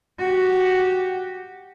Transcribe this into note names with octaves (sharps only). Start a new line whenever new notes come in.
F#4 G4